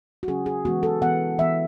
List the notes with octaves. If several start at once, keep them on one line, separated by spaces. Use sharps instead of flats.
F#4
C#3 F#3 C#4 G#4
G#4
E3 G#3 B3 F#4
A4
E3 B3 F#5
E3 B3 E5